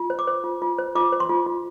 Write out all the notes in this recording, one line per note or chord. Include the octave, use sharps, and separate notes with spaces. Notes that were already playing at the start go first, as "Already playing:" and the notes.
Already playing: F4
C5
D6
C5
F4
F4
C5
F4 D6
C5
C6
F4
F4